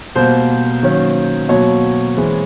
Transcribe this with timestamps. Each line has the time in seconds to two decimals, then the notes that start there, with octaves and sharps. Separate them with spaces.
0.16 B2 G3 A#3 C5
0.83 D#3 F#3 A#3 C#4
1.49 B2 F#3 A#3 C#5
2.15 E3 G#3 C4